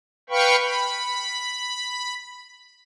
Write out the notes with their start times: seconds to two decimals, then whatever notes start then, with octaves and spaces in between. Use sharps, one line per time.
0.30 B4 F5 G5 B5 C#6
0.61 B5